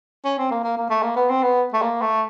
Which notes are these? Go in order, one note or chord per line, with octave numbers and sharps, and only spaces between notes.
C#4
C4
A#3
A#3
A#3
A3
A#3
B3
C4
B3
A3
A#3
A3